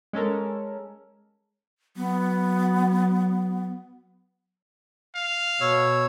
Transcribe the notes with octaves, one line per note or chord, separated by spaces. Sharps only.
G#3 C#4 A4 A#4
F#3 B3
F5
B2 C#5 E6